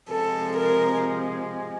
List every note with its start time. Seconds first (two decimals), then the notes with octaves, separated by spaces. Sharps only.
0.10 C3 F3 G#3 A4
0.57 A#4